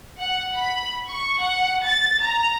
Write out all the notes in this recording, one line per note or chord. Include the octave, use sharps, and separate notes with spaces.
F#5
B5
C#6
F#5
A6
A#5